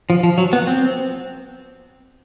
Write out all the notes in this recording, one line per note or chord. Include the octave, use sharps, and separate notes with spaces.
F3
F3
F#3
B3
C4